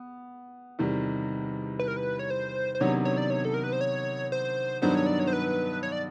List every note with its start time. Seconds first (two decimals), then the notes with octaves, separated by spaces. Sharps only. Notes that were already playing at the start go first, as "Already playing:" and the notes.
Already playing: B3
0.79 E2 C3 D#3 G3
1.79 B4
1.88 A#4
1.97 B4
2.19 C#5
2.30 C5
2.75 C5
2.80 C3 D#3 F#3 B3 D4 C#5
3.05 C#5
3.18 D5
3.30 C#5
3.45 A4
3.54 A#4
3.64 B4
3.73 C5
3.81 C#5
4.32 C5
4.82 G2 D#3 F#3 B3 D4 C5
4.95 C#5
5.06 D5
5.19 C#5
5.27 C5
5.33 B4
5.83 C#5
5.92 D5